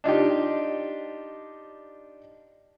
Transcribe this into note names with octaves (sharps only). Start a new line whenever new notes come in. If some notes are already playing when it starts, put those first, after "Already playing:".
D4 D#4 F4 G4